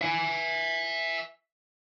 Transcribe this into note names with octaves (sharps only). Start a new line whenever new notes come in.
E5 G#5